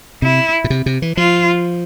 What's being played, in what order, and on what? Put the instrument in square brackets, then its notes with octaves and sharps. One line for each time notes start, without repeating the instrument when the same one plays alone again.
[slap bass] C3 [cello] E4
[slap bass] A#2
C3
C3
E3
[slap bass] F3 [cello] F4